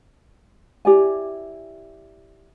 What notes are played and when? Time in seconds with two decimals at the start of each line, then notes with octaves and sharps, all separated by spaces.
0.85 E4 G4 D5 G#5